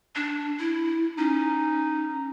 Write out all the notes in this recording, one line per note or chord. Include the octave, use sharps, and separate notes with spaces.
D4
E4
C#4 D#4